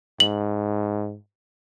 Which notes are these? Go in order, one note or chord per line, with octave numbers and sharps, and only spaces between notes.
G#2 F#7